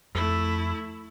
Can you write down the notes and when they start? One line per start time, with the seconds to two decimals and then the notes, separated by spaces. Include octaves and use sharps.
0.15 F2 A3 E4